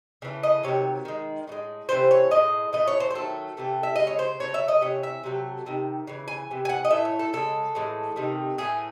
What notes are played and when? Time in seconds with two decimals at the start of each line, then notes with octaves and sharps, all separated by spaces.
0.22 C#3 E3 A3
0.43 D#5
0.63 C3 D#3 F#3 C#5
1.05 D#3 G#3
1.47 A2 E3
1.52 G#3
1.89 C3 E3 A3 C5
2.11 C#5
2.31 A2 G#3 D#5
2.73 A2 E3 A3 D#5
2.87 C#5
3.00 C5
3.11 C5
3.15 D#3 F#3 A3 A4
3.57 C3 E3 A3
3.83 E5
3.96 C#3 G#3 D#5
4.07 C#5
4.19 C5
4.40 C#3 F#3 A3 C#5
4.54 E5
4.68 D#5
4.81 C3 E3 C#5
5.03 E5
5.23 C3 F#3 A3
5.66 C3 D#3
6.07 C#3 E3
6.28 G#5
6.51 C3 E3
6.65 G#5
6.69 F#5
6.85 D#5
6.91 A2 E3 A3 E5
7.05 C#5
7.19 A4
7.33 C#3 G#3 A4
7.75 A2 E3 G#3
8.16 C3 D#3 A3
8.58 A2 E3 A3 G#4